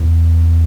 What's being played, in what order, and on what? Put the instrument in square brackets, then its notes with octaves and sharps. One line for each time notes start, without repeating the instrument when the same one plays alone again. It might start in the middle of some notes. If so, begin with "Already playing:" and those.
Already playing: [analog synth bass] E2